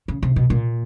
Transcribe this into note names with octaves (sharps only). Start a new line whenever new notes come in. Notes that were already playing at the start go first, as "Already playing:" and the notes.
C#3
C3
B2
A#2